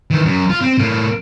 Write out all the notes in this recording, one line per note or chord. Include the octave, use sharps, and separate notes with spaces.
D#3 E3
F#2
F4
C4
A2 A#3